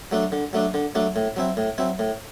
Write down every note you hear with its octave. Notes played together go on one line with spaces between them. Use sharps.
F#3 A3 D4
D3
F#3 A3 D4
D3
F#3 A3 D4
A2
F#3 C4 E4
A2
F#3 C4 E4
A2